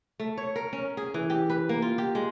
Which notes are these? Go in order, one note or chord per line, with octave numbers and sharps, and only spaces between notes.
A3
C#5
A#4
C#4
G#4
E3
G4
B4
A#3
F4
G4
G#3